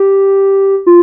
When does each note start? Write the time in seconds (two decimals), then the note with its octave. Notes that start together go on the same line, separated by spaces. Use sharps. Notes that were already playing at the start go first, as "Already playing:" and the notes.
Already playing: G4
0.87 F4